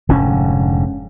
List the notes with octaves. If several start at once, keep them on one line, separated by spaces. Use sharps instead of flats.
F1 G#2 D3 C#4